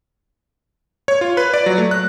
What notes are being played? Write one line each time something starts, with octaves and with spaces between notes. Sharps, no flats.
C#5
F4
B4
D5
F#3
A3
F#6